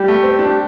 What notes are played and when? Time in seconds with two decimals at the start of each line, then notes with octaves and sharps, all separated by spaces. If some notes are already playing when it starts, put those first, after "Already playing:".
Already playing: G3 G4
0.08 A3
0.23 C4
0.39 D4
0.48 G4